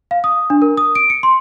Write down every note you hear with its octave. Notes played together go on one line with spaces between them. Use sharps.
F5
D#6
D4
A#4
D#6
D7
C#7
C6